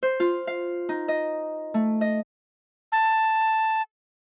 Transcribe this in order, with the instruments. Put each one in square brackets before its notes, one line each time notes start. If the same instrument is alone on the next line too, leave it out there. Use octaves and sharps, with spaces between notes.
[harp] C5
F4
F5
D#4
D#5
A3
D#5
[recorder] A5